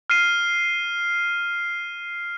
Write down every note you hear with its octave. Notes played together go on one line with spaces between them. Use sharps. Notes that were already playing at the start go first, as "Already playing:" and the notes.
F6 C7 D#7